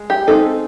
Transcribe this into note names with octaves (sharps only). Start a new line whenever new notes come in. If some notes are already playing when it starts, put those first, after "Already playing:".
Already playing: G#3
G4
G#3 C4 D#4 A4